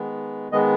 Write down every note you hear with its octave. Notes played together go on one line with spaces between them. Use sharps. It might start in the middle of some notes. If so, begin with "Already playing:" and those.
Already playing: D#3 G#3 B3
D#3 G#3 B3 D#5